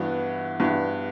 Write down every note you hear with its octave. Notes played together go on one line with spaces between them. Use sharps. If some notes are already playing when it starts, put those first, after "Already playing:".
Already playing: G2 E3 B3 F#4
G2 E3 B3 F#4